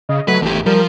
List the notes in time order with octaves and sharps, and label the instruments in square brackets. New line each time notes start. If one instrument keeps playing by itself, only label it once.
[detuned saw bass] C#3 [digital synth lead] D#5
[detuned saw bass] F#3 [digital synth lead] A3 [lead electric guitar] B4
[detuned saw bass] G#1 [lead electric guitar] E2 G4
[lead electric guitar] F3 [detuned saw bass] G3 [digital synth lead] A#4